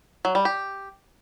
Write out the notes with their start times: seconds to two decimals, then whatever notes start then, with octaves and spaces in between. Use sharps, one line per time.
0.25 F#3
0.35 G3
0.45 G4